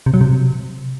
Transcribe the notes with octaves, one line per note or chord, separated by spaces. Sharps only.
C3
F#3
C3